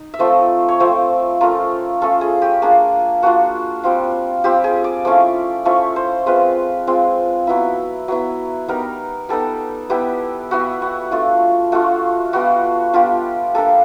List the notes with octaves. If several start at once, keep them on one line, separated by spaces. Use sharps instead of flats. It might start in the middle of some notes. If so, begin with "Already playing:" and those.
Already playing: D#4
E5
F3 A3 C4 D#5
C#5
F3 A3 C4 C5
A3 C#4 F4 A#4
A3 C#4 F4 A4
G#4
G4
A#3 D4 F4 G#4
A#3 D4 F4 F#4
G3 C4 F4
G3 C4 F4 G4
G#4
D5
F3 A3 C#4 E4 D5
F3 A3 C#4 E4 C#5
C5
G#3 C4 F4 B4
G#3 C4 F4
F#3 B3 E4
F#3 B3 E4
G3 B3 D#4 A#4
G3 B3 D#4 A4
G3 B3 E4 G4
G3 B3 E4 F#4
F#4
A3 D4 F4
A3 D4 F4 F#4
G3 B3 D4 F4 F#4
G3 B3 D4 F4 G4
G3 A#3 D4 A4